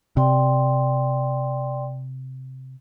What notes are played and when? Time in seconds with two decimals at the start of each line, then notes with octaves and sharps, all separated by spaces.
0.17 C3 D5 G5 C6